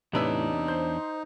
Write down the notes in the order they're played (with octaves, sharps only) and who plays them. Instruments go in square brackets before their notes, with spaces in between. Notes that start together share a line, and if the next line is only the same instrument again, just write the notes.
[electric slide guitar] E2 D4 C#5 [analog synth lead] A2 [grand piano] C3 B4 E6 [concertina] D#4
[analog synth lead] C5 [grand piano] G6